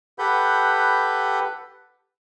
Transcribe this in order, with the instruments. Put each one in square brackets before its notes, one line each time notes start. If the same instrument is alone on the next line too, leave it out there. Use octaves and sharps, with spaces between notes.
[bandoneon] G4 A4 B4 F#5 B5 G6